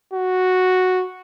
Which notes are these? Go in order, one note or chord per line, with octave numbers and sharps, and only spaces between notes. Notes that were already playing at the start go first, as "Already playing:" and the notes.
F#4